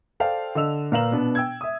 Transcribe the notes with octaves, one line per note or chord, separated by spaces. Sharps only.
A4 C5 D5 F5 G5 A5
D3 D#5 E6 F7
A#2 B4 F5 A#5 E7 F#7
B2 B3 D4
G5 E6 G#6
E5 D#6